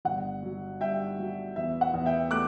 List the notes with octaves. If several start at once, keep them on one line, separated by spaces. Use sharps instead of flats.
G1 F#5
F#3
G2 E5 G5
F#3
E2 E5
F#5
E2
E5 G5
A3 D6 F#6